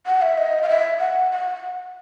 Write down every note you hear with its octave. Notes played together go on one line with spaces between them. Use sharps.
F#5
E5
D#5
F5
E5
F#5
F#5